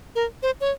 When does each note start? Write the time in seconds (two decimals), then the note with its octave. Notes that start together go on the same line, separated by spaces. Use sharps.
0.15 A#4
0.43 C5
0.61 C#5